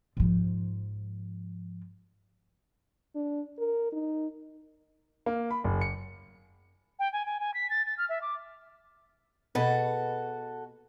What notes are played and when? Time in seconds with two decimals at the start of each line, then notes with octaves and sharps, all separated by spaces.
0.17 G#2 F3
3.15 D4
3.59 A#4
3.93 D#4
5.26 A#3
5.51 B5
5.64 F#1
5.81 C#7
6.99 G5
7.13 G#5
7.26 G#5
7.40 G#5
7.54 B6
7.70 A6
7.86 A6
7.98 F6
8.09 E5
8.22 D6
9.55 B2 F#4 G#4 A4 B4